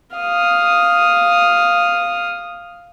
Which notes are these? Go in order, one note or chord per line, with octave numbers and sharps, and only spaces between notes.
F5 D#6